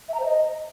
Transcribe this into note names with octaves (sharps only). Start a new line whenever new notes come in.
E5
A#5
C5
D#5